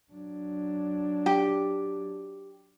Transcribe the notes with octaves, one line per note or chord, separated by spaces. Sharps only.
F#3 D4
G4